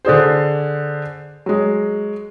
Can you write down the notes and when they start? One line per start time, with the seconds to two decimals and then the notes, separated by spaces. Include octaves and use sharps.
0.05 D3 D4 G#4 C5
1.46 F#3 G#3